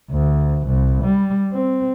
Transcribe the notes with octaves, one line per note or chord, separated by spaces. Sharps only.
D2
C2
G3
C4